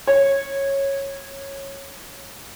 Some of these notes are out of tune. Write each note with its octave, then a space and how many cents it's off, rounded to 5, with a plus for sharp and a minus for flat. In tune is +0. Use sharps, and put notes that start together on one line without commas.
C#5 -15